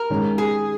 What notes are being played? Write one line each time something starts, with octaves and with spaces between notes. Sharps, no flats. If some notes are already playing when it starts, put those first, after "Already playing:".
Already playing: A#4
D#3 G#3 C#4
G#4